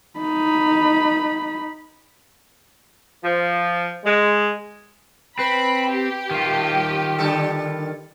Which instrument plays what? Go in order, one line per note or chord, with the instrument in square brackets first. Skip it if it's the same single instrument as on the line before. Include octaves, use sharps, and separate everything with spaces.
[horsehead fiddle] D#4 B5
[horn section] F3
G#3
[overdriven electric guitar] C4 [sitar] B4 [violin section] B5
[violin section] G4
[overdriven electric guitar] D#3 F4
[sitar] D3 G3 A4